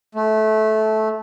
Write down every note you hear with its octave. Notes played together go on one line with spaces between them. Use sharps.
A3